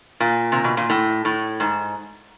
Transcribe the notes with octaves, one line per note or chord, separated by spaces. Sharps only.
A#2
C3
B2
A#2
A2
A2
G#2